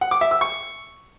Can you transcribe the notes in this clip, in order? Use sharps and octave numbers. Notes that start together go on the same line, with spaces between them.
F#5
D6
E5
E6
C#6